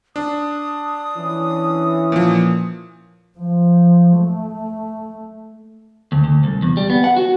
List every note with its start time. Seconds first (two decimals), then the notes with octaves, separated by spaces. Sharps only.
0.16 D4 D#6
1.17 E3 C#4
2.12 A#2 F3
3.39 F3
4.18 A3
6.12 D2
6.24 D2
6.44 C2
6.62 E2
6.77 G3
6.90 B3
7.04 F#5
7.16 F#4